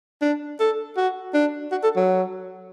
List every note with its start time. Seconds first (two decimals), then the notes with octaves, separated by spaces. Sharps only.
0.22 D4
0.60 A4
0.97 F#4
1.34 D4
1.72 F#4
1.83 A4
1.96 F#3